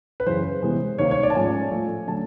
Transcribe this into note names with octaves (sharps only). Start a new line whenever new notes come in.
B4
F#2 C#3 E3 C5
C3 E3 G#3 B3
C3 D#3 G3 A#3 C#5
C#5
D5
A5
G#2 F3 A3 C#4 G#5
A2 F3 A3
D3 F#3 A3 C#4 A5